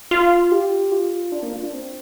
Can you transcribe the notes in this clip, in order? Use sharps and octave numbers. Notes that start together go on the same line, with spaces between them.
F4
G4
F4
D4
A#3
F4
D4
C4